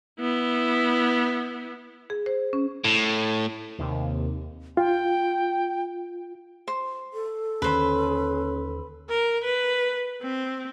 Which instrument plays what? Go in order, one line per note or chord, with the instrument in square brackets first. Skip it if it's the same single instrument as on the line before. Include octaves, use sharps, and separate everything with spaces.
[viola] B3 E4
[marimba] G#4
C5
C#4
[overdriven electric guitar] A2
[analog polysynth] D#2 C3
[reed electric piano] F4 [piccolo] G5
[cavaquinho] C5
[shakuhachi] A4
[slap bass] D#2 D3 D#3 [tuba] C#4 [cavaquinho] B4 C5 B5
[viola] A#4
B4
C4